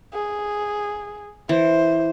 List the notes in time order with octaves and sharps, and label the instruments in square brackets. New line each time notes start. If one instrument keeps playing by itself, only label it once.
[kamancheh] G#4
[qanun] E3 [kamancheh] C5